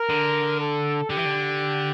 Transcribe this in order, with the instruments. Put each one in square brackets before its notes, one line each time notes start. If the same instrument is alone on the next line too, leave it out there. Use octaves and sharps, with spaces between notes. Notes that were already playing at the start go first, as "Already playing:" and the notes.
Already playing: [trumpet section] A#4
[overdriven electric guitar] D3
[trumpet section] A4
[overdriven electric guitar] D3 [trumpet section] G4
[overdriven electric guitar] E3
D3